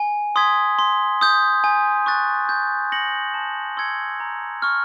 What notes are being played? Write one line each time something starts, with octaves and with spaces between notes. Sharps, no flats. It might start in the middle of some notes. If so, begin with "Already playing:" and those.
Already playing: G#5
C6 D#6 G#6 B6
C6
D#6 G6
G#5
C#6 F#6 A6
G6
A#6 C#7 F#7
A5
C6 E6 G#6 C#7
A#5
C#6 F6